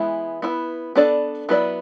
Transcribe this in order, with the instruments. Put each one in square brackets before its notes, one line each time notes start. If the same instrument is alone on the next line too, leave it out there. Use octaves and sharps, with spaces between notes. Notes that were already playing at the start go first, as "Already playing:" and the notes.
Already playing: [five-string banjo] E3 G#3 B3 E4
B3 E4 B4
B3 D4 A4 D5
F#3 B3 E4 B4 D5